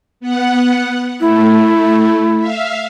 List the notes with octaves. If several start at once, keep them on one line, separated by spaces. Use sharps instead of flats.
B3 F#5
A3 E4
E5 F5